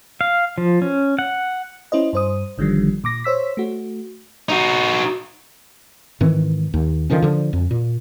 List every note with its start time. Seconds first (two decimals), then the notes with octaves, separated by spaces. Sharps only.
0.21 F5
0.58 F3
0.82 C#4
1.19 F#5
1.92 C#4 E4 C5 D#5
2.13 G2 C5 D#6
2.58 G#1 D3 D#3 F3 G3
3.04 A#2 D6 A#6
3.24 C5 C#5 E6 B6
3.57 A3 F#4
4.49 D#4 F#4
6.21 G#2 D#3 E3 C4
6.74 D#2
7.10 D3 D#3 F3 C#4
7.22 D3 F3
7.53 F2
7.71 A#2